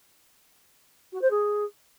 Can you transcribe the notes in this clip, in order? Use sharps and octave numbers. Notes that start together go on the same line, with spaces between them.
F#4
C5
G#4